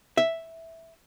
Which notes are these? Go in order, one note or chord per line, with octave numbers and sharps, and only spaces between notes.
E5